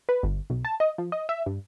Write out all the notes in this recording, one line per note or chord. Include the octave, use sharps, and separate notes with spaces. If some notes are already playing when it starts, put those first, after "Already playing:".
B4
G1
B1
A5
D#5
F3
D#5
E5
G2